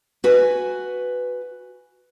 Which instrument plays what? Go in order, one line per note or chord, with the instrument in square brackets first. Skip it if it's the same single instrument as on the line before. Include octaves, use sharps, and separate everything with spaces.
[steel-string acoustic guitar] F#4 B4 G#5